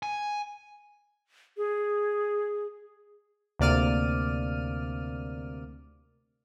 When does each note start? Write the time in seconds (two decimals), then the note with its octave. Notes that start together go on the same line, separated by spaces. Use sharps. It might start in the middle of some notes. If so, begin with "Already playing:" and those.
0.03 G#5
1.57 G#4
3.59 D2 C3 A#3 D5 F6 D#7